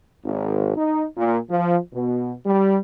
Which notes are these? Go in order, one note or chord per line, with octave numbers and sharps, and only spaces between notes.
G#1
D#4
A#2
F3
B2
G3